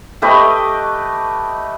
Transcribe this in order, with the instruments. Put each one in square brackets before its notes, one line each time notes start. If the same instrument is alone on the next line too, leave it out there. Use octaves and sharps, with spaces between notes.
[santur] A3 G4 B4 D#5